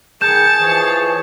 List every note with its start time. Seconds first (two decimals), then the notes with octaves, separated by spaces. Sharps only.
0.21 D#3 G#4 A5 G6 C#7 E7
0.59 E3 F3 C#5